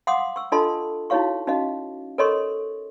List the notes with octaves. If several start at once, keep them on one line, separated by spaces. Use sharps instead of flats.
F5 F#5 C6 D6 D#6
C#6 E6
D4 F4 A4 D#5 A5 C6
D#4 E4 F#4 C#5 F5 C#6
C#4 D#4 F#4 D#5 F5
A4 A#4 C#5 D#5 C6 C#6